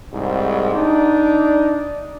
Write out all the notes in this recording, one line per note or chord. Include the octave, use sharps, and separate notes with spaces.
C2 G#2
D4 D#4